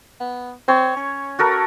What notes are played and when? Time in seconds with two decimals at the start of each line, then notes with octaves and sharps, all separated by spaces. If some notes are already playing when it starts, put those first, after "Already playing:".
0.21 B3
0.68 C4 C#5
0.97 C#4
1.39 F#4 A4 A#4